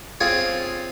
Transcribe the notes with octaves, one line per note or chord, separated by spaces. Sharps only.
C4 F4 G#4 C#5